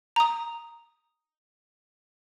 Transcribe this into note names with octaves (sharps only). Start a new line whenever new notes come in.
A#5 D#6